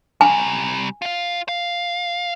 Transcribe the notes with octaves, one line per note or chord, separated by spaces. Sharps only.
C3 G3 G#5
F4 F5
F5